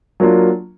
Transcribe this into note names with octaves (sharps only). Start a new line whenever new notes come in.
F#3 A#3 D4 F4